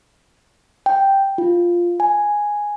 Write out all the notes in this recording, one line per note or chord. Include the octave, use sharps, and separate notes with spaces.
G5
F4
G#5